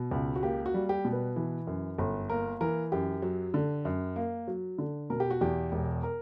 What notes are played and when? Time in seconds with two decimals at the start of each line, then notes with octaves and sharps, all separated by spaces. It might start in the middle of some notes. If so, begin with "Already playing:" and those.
Already playing: B2
0.11 C#2
0.36 F#4
0.43 A#3 G4
0.66 F#4
0.74 G3
0.89 G4
1.05 B2
1.13 B4
1.36 E3
1.67 F#2
1.98 G1
2.30 A#3 A#4
2.61 E3 A#4
2.92 F#2 G4
3.22 F#3
3.54 D3
3.85 F#2
4.16 A#3
4.48 F#3
4.78 D3
5.10 B2 A#4
5.20 G4
5.31 F#4
5.41 E2 G4
5.72 E1
6.03 A#4